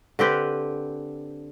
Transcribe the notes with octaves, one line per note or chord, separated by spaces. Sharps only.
D3 C4 G4 B4